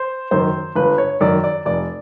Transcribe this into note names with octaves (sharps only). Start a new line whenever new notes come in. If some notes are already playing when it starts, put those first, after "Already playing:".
Already playing: C5
F#2 D#3 C5
G1 B4
C#5
F#2 D#3 D5
D5
F1 D5